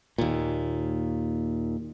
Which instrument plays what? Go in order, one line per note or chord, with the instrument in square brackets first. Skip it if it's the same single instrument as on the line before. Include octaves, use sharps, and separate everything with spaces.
[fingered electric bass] D#2 A#2